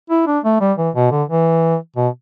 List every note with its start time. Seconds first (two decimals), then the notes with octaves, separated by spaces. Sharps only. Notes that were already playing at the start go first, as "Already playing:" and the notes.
0.10 E4
0.27 D4
0.44 A3
0.61 G3
0.78 E3
0.95 B2
1.12 D3
1.29 E3
1.96 B2